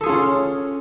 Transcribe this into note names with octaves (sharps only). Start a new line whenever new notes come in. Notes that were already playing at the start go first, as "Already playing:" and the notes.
C#4 F4 G#4 A4